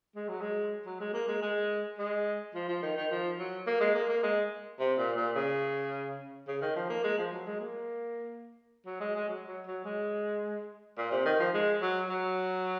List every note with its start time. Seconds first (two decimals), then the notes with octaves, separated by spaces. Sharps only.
0.15 G#3
0.28 F#3
0.41 G#3
0.86 F#3
1.00 G#3
1.14 A#3
1.28 G#3
1.42 G#3
1.98 G#3
2.55 F3
2.68 F3
2.82 D#3
2.97 D#3
3.11 F3
3.39 F#3
3.67 A#3
3.80 G#3
3.95 A#3
4.09 A#3
4.23 G#3
4.79 C3
4.98 A#2
5.17 A#2
5.35 C#3
6.48 C#3
6.62 D#3
6.76 F3
6.89 A#3
7.04 G#3
7.18 F3
7.32 F#3
7.46 G#3
7.60 A#3
8.86 F#3
9.00 G#3
9.15 G#3
9.29 F#3
9.48 F#3
9.67 F#3
9.84 G#3
10.98 A#2
11.11 C3
11.25 D#3
11.39 F3
11.54 G#3
11.81 F#3
12.09 F#3